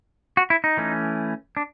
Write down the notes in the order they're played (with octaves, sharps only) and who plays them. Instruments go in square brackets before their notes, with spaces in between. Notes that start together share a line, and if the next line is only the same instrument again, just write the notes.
[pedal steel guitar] F#4
E4
D#4
E3 A3 C#4
D4